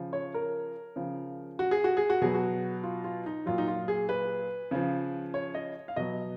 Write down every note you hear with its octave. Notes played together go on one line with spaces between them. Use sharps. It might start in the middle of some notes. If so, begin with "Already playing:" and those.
Already playing: C#3 F3
C#5
A#4
C#3 F3
F#4
G#4
F#4
G#4
F#4
B2 F#3 G#4
F#4
F4
F4
D#4
A#2 F#3 F4
D#4
F4
G#4
B4
C#3 F3
C#5
D#5
F5
B2 F#3 D#5